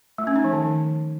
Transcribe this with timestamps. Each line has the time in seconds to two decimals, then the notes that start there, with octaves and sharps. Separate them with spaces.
0.18 A3
0.27 C#4
0.36 D#4
0.44 F3
0.53 D#3